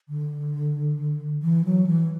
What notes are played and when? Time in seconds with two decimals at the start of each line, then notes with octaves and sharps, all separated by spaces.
0.09 D3
1.42 E3
1.64 F#3
1.87 E3